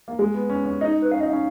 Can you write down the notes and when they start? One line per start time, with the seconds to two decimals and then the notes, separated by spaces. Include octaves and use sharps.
0.08 A#3
0.19 G#3
0.34 B3
0.50 C#4
0.66 C#4
0.81 D#4 D#5
1.02 B4
1.12 C#4 F5
1.21 D#4 D#5
1.28 F5
1.33 C#4